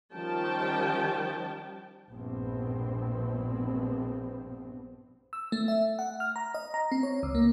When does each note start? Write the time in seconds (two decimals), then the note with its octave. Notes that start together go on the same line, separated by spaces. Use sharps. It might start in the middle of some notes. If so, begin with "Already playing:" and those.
0.14 D#3 F3 G3 C#4 G5 A5
2.09 A#1 G2 B2 B3 C4
5.33 E6
5.52 A3
5.68 E5
5.99 F#5
6.20 F6
6.36 A#5
6.54 D#5
6.74 A#5
6.92 C4
7.03 C#5
7.23 C#2
7.35 A#3